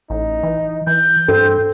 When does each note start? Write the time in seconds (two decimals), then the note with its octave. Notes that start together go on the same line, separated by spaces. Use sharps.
0.10 A1 D#4
0.43 E3
0.87 E3 G6
1.28 G2 C4 A4